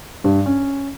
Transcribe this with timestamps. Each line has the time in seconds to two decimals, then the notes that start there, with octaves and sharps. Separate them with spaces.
0.24 G2
0.46 C#4